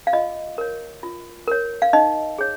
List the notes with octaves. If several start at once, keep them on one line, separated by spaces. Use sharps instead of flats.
F5
F4 D#5
A#4 C#5
F4
A#4 C#5
F5
D#4 D#5
G#4 C#5